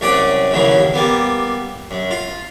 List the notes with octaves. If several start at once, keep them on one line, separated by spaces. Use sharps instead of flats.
C2 F#2 C#4 D5 F#5
A1 D#2 C#3 E3 F#3
G3 A#3 B3
F#2
F4